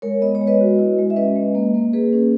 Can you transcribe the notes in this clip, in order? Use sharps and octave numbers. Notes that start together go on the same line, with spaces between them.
G#3 A#4 C#5
B3 D#5
C#5
G#3
B4 D#5
F#4
E4
G#3
E5
C#4 B4 D#5
G#3
A#3
A#3
A#3 G#4 B4
C#4